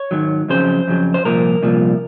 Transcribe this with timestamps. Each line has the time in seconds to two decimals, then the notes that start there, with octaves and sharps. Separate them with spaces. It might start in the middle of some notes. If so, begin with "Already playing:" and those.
Already playing: C#5
0.11 G#2 D#3 F#3
0.49 F2 C#3 F#3 C5
0.87 F2 C#3 F#3
1.14 C5
1.25 C2 A#2 F3 A#4
1.63 C2 A#2 F3